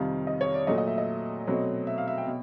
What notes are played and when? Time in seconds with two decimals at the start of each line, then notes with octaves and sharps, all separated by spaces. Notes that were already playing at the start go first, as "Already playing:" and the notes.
Already playing: F2 C3 D#3 G3 F5
0.27 D#5
0.41 C#5
0.54 D5
0.67 A#2 F#3 A3 D#5
0.78 D#5
0.87 E5
0.98 D#5
1.47 B2 F#3 A3 C4
1.87 E5
1.98 F5
2.08 E5
2.18 G5
2.27 B2